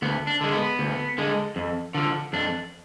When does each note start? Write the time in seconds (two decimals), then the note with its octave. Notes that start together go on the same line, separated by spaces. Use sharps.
0.02 D2 B3
0.27 D4
0.41 D3 G#3
0.53 B3
0.79 D2
1.18 D3 G#3
1.56 F2
1.94 D3 F3
2.33 F2 D4